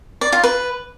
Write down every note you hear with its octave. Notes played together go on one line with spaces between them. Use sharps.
D5
F4
B4